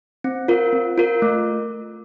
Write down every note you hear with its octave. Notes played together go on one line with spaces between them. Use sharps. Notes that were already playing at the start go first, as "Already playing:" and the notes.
C4
F4 A#4
C4
F4 A#4
A3